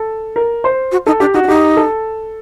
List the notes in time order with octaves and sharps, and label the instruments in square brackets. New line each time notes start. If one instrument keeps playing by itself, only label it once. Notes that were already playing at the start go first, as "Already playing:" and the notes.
Already playing: [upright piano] A4
A#4
C5
[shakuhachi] F#4
[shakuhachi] D#4 [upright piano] A4
[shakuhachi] D4 [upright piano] G4
[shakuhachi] D#4 [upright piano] F#4
[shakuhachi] D4
[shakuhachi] D#4 [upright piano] G4
[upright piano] A4